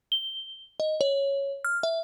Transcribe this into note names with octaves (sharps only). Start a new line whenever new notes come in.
G7
D#5
C#5
F6
E5